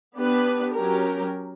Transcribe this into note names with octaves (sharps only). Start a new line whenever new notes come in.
B3 D4 G4 B4
F#3 C#4 G4 A#4